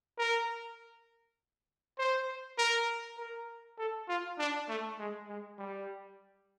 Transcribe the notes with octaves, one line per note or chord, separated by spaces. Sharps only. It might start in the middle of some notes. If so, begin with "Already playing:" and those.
A#4
C5
A#4
A#4
A4
F4
D4
A3
G#3
G#3
G3